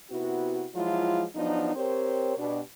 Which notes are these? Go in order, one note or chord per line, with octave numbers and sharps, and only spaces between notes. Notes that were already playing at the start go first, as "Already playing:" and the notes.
C3 B3 E4 F#4
F3 F#3 G#3 E4 F4
F3 F#3 B3 D4 D#4
C4 G4 A#4 C5 C#5
B2 D4 G4